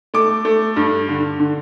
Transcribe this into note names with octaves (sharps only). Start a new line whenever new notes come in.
A3 D6
A3
G2
D3
D3